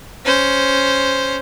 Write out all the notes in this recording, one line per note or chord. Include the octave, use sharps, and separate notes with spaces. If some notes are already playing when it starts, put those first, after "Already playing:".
C#4 C5